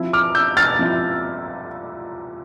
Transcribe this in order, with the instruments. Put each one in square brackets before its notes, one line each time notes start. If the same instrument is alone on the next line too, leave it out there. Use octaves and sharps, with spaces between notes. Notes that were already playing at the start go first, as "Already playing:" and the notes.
Already playing: [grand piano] F3 C4 E4
D6 F6
E6 G6
F6 A6
F3 C4 E4